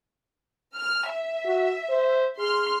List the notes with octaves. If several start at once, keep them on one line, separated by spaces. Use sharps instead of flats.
F6
E5
F#4
C5
G#4 C6 F6